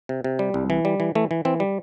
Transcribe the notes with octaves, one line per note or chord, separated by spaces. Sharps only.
C3
C3
G3
C2
E3
G3
E3
E3 A3
E3
E3 C4
G3